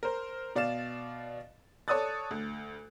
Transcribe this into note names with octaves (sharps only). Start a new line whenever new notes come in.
A#4 C5
B2 D5 F5 A6 E7
A4 C#5 D5 D#6 F#6 A6
D2